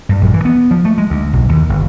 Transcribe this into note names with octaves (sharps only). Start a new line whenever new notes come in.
G2
A#1
E3
B3
F3
A3
G#3
D2
B1
D#2
G1